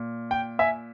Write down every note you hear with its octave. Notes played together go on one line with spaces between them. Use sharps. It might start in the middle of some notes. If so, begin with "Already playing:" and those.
Already playing: A#2
G5
E5 G#5